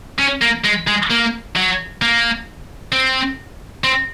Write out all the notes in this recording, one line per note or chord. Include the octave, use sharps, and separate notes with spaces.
C#4
A#3
G#3
G#3
A#3
F#3
A#3
C4
C4